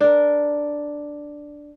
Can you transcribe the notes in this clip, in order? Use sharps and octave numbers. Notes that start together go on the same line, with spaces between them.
D4 A#4